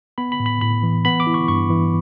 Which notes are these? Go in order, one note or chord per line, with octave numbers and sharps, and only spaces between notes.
B3 B5
B5
A2
B5
A2 B5
E3
B3 B5
D6
E4
C#6
G2 C#6
E3